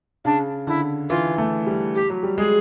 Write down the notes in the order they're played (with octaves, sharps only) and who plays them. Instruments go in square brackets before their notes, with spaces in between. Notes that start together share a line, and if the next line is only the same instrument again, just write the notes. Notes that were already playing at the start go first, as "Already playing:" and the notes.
[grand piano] C#3 [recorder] D4
[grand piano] D3 [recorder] E4
[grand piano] E3 [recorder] F4
[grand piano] A3
G3
[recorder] G4
[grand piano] F#3
G3
[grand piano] G#3 [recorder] G#4